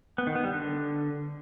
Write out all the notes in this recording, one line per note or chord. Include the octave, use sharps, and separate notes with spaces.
B3
D#3
B3
G3
D3